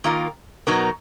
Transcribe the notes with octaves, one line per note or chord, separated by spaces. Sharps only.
D#3 A#3 F4 A#4
B2 F#3 B3 D#4 A#4